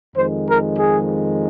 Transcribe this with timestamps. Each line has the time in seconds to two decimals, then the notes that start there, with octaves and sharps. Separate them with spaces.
0.15 F2 D#3 G#3 C5
0.47 A#4
0.78 G#4